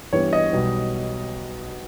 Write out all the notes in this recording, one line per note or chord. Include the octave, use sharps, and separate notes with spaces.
G2 E3 G3 B3 C#5
D#5
B1 B2 G3 B3